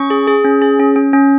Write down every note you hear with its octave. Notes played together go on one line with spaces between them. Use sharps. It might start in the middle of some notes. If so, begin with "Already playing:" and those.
Already playing: C#4 C#6
G#4
G#4
C#4
G#4
C#4
C#4
C#4